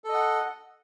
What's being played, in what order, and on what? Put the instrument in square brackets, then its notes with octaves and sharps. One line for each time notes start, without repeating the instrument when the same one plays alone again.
[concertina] A4
D#5
F#5